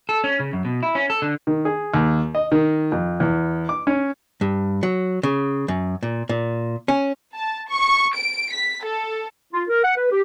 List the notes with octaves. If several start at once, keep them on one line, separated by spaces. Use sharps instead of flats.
A4
C#4
C#3
F#2
B2
E4
C#4
A4
D3
D#3
G#4
D#2
D#5
D#3
F2
E2
D6
C#4
G2
F#3
C#3
F#2
A#2
A#2
C#4
A5
C#6
D7
B6
A4
F4
A#4
F#5
B4
G4